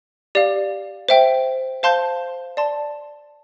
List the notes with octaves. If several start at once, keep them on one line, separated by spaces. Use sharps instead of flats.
G4 D5 F5
C5 E5 G5
C5 F5 A5 C6 G6
D5 A5 C6